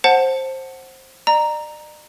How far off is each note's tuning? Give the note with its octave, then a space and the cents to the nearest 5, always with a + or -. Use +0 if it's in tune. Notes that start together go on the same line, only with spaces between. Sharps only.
C5 +15 F#5 +0 A5 +10
D5 +45 A#5 +0